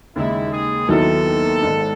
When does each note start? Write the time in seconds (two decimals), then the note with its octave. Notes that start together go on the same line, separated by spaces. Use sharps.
0.16 D#2 C#3 G#3 D#4 E4
0.52 G#4
0.88 D#2 D#3 F#3 B3 E4 A4
1.62 G#1 G#2 D#3